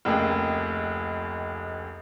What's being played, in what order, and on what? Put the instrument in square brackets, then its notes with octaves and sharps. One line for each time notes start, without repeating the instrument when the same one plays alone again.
[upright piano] F1 C#2 A#3 G#4 G5